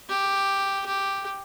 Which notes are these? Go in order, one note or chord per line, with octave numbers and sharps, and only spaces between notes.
G4
G4